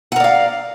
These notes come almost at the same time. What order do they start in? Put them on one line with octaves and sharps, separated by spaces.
F#5 A#4 D5 F5